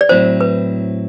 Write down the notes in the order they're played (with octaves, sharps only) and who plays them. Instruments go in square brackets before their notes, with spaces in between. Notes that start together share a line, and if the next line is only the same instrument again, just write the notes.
[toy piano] D5
[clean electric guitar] A2 F#3 C4 E4 [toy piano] C5
[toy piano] B4